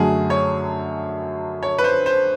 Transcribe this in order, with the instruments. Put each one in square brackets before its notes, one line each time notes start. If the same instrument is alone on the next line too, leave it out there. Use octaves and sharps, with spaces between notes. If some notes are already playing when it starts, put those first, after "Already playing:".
Already playing: [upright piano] F#2 D3 F#3 A3 [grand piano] G#4
[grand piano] C#5
C#5
B4
C5
C5